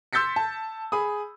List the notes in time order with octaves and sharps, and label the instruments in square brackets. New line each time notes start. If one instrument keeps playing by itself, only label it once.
[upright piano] C6 E6 G6 A6 B6 C#7
A5
G#4 B5 D#6